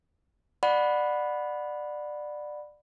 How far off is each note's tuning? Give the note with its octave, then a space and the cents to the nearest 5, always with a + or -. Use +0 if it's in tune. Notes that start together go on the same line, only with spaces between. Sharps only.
D5 +20 F#5 -15 B5 +0